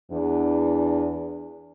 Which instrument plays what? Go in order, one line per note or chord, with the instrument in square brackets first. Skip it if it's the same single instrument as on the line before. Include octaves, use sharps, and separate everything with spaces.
[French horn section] E2 D4